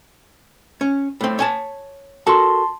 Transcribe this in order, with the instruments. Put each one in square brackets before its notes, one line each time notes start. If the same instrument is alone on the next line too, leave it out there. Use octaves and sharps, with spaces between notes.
[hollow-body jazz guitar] C#4
A2 C4
C#5 G#5 A5
[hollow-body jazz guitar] F#4 A4 A#4 [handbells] A5 C6